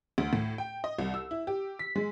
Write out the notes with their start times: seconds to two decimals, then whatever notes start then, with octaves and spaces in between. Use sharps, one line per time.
0.18 D2
0.33 A2
0.58 G5
0.84 D#5
0.99 C2
1.14 E6
1.31 E4
1.47 G4
1.79 B6
1.96 G#3